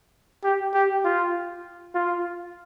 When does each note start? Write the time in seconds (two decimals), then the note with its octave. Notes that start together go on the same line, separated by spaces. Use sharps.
0.44 G4
0.74 G4
1.04 F4
1.95 F4